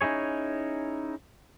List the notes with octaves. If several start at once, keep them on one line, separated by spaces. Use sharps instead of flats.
C#4 D#4 E4 G#4 C#5